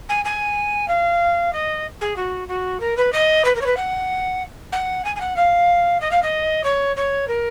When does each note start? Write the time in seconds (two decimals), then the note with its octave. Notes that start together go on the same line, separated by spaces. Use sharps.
0.09 G#5
0.25 G#5
0.88 F5
1.53 D#5
2.01 G#4
2.16 F#4
2.48 F#4
2.80 A#4
2.97 B4
3.12 D#5
3.45 B4
3.55 A#4
3.61 C#5
3.66 B4
3.77 F#5
4.72 F#5
5.05 G#5
5.16 G#5
5.20 F#5
5.36 F5
6.00 D#5
6.11 F5
6.22 D#5
6.64 C#5
6.96 C#5
7.28 A#4